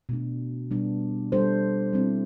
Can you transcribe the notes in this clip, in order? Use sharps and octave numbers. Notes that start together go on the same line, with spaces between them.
B2 A3 D4
B2 G3 B3 D4
G3 D4 A4 C5
G3 C4 E4